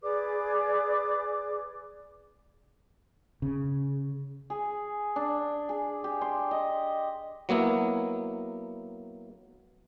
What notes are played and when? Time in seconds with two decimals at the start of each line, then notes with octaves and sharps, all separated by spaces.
0.02 G#4 B4 D5 D6
3.42 C#3
4.50 G#4
5.16 D4
5.69 G#4
6.04 G4
6.21 C6
6.51 D#5
7.49 F#3 A#3 B3 E4